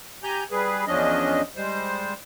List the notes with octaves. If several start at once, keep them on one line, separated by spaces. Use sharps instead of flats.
G4 G#5 A#5 G6
G3 G#4 B4
E2 F3 C#4 D4 D#5
G3 G#3 C5